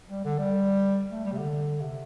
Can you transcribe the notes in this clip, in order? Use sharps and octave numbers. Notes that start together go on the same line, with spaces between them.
G3
D3
G3
A3
G3
C3
D3
C3